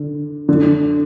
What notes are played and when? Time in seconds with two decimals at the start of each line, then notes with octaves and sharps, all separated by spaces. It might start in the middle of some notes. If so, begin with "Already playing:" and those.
Already playing: D3
0.49 D3